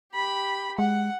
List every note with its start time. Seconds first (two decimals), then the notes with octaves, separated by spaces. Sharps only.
0.13 G4 B5
0.79 G#3 F#5